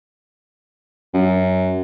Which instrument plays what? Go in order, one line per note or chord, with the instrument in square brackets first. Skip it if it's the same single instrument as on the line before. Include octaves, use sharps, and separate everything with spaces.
[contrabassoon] F#2